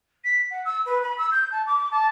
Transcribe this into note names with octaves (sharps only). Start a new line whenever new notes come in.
B6
F#5
E6
B4
B5
E6
G6
A5
D6
A5